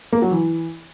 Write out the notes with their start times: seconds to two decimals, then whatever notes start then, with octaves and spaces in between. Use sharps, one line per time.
0.12 A#3
0.22 F#3
0.31 E3